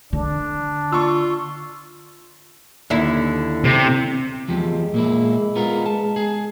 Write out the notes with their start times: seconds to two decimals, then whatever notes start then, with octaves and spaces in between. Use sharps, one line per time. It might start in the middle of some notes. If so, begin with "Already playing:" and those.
0.13 D3 D4
0.92 F4 C#6 E6
2.90 D#2 D3 E4
3.64 C3
4.48 E2 F3 G#3 G4
4.94 A#2 A#3 E4
5.56 B3 F4 A#4
5.86 A5
6.16 G#4